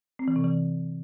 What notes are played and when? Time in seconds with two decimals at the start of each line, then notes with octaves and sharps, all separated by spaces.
0.19 C4
0.28 E3
0.36 C3
0.44 E3